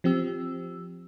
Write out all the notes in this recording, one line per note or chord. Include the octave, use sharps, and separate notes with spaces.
F3 C4 G4 E6